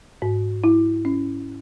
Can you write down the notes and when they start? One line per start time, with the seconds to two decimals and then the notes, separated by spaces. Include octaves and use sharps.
0.22 G#2
0.64 E4
1.05 C#4